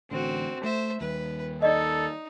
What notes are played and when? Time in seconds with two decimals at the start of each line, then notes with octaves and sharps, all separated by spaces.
0.11 A1 D3 C4 F#4
0.64 A3 C5 E5
1.01 D#2 G3 B4
1.62 D#4 A4 D5 D#5